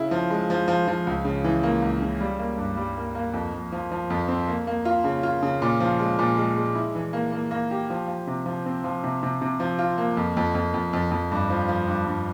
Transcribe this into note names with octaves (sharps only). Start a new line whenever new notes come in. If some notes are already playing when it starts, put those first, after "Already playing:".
Already playing: C#3 E4
F3
G#3
F3
F3
F3
C#2
C#3
E3
A#3
C#2
C#3
G3
A#3
G2
G3
A#3
A#3
F2
F2
F3
F3
F2
C4
A#3
A#3
F4
C#3
F4
C#3
A#2
F3
G#3
A#2
G#3
G#3
E4
E3
A#3
A#3
A#3
G4
F3
F3
C3
F3
C4
F3
C3
C3
C3
F3
F4
A#3
F2
F2
F2
F2
F2
F2
G2
F3
F3
G2
G2